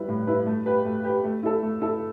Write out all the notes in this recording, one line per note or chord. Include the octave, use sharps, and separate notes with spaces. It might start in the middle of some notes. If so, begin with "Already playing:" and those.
Already playing: G3 E4 B4
A2
G3 E4 B4
A3
G4 B4
A3
G4 B4
A3
E4 A4
A3
E4 A4